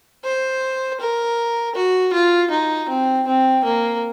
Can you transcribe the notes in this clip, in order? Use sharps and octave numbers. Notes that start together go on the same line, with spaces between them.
C5
A#4
F#4
F4
D#4
C4
C4
A#3